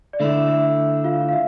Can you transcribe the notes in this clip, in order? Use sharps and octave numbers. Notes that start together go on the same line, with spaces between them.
D5
D3 A3 E4 E5
E5
F4 F5
F5
E5